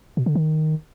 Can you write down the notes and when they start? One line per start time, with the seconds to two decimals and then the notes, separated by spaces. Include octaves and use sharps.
0.17 B2
0.26 D3
0.35 D#3